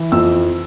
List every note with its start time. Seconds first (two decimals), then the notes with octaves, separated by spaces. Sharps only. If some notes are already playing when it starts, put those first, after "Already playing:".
Already playing: E3
0.12 F2 E6